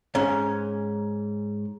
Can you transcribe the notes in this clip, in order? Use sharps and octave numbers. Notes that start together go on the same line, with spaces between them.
G#2 C#4